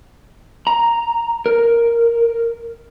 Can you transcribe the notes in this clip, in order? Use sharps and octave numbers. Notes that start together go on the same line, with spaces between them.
A#5
A#4